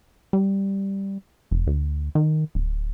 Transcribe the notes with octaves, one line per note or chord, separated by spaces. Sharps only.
G3
F1
D2
D#3
D1